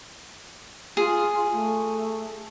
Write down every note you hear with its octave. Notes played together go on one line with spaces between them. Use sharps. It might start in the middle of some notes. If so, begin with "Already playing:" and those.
F4 G#4
A3